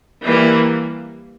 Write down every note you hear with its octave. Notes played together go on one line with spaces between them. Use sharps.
E3 G3 A#3